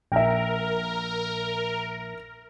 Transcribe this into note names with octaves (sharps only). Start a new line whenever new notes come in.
A#1 A#4 E5 G5